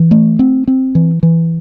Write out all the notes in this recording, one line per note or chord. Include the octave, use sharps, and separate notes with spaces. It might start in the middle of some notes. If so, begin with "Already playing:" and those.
Already playing: E3
A3
C4
C4
E3
E3